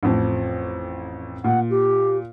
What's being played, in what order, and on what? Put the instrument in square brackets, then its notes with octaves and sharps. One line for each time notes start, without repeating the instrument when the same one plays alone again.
[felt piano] A1 F2
[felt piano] A#2 [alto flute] F#5
[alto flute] G4